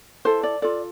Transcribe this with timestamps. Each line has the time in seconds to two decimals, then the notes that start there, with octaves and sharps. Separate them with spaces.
0.25 E4 A4 C5
0.43 D5
0.62 F4 A4 D5